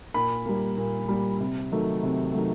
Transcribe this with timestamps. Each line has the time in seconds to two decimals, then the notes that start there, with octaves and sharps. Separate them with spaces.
0.14 A#2 B5
0.46 G3 A#3
0.77 A#2
1.08 G3 A#3
1.40 C3
1.72 D#3 F#3 A3
2.03 C3
2.34 D#3 F#3 A3